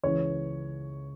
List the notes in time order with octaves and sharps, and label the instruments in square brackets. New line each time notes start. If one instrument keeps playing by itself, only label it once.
[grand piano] C#2 C#3 E3 C#5